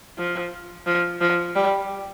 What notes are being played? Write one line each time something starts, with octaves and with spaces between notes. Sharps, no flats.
F3
F3
F3
G3